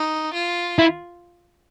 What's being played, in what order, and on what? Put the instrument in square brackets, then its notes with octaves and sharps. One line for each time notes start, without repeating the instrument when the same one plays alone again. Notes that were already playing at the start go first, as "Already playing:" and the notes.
Already playing: [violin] D#4
F4
[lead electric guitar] E4